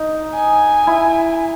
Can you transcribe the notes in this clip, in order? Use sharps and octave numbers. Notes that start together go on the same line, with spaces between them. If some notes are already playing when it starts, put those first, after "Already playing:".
Already playing: D#4
G#5
E4